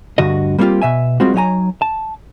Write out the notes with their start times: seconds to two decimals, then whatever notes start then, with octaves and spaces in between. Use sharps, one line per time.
0.18 D2 G2 D3 F#4 D#5
0.58 G3 A#3 C4 D4 F4 G4
0.82 B2 E5 G#5
1.20 G3 G#3 C4 F4 F#4
1.34 F#3 D#4 C#5 D#5 G#5 A#5
1.82 A5